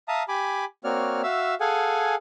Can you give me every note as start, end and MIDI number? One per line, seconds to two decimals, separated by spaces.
0.08 0.23 76
0.08 0.23 77
0.08 0.23 81
0.08 0.23 82
0.08 0.23 87
0.28 0.65 67
0.28 0.65 80
0.28 0.65 83
0.28 0.65 86
0.84 1.22 58
0.84 1.22 60
0.84 1.22 66
0.84 1.22 73
0.84 1.22 74
0.84 1.22 89
1.23 1.55 66
1.23 1.55 76
1.23 1.55 77
1.23 1.55 88
1.60 2.15 68
1.60 2.15 69
1.60 2.15 77
1.60 2.15 78
1.60 2.15 80